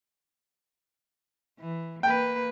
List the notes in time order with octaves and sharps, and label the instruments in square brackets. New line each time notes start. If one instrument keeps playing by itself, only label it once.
[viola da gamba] E3
[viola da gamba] A#3 B4 [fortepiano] G5